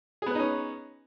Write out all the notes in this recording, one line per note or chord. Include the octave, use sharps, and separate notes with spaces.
B3 C#4 D#4 G#4 B4